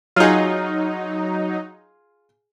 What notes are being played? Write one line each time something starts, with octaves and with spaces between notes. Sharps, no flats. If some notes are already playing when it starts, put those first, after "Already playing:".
F#3 D#4 F4 G#4